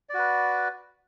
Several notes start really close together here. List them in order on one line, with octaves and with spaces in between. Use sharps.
D5 F#4 B4